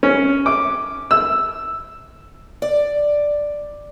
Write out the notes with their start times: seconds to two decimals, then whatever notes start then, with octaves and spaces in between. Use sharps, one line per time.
0.03 C#4
0.46 D6
1.11 E6
2.62 D5